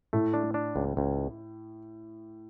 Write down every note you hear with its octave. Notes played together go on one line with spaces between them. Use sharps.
A2 A3
D4
D4
C#2
C#2